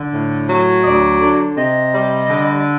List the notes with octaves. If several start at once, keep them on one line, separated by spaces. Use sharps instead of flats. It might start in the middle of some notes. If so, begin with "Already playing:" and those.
Already playing: D3
A2
F#3
D#5
D2 D5
D3
C3 D#5
G3
D3